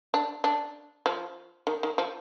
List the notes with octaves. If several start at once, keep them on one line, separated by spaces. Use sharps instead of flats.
D4
D4
F3
D#3
D#3
F3